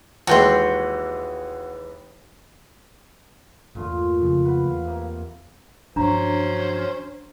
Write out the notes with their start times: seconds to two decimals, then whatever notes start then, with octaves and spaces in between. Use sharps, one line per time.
0.27 D#2 E3 G#3 F#4 G5 C6
3.75 G1 E2 A#2 A3 F4
4.21 F2 C#3
4.44 B4 F#5
4.66 E2 F5
4.85 C3 A#3
5.96 G2 F3 F#3 C#4 D4 C5 A#5